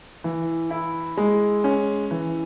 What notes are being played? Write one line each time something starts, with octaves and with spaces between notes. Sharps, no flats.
E3
E4
G#3
C#4
E3